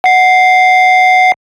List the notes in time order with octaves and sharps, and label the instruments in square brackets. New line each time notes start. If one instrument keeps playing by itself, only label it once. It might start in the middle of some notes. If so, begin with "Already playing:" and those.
[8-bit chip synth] F#5 C7